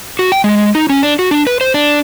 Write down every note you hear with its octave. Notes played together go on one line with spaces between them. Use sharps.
F#4
G5
G#3
D#4
C#4
D4
F#4
D4
B4
C5
D4